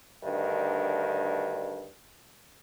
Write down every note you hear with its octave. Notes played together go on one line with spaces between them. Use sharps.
D2 G2 D#3